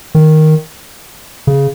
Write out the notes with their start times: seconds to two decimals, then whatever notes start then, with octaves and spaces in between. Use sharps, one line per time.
0.15 D#3
1.47 C#3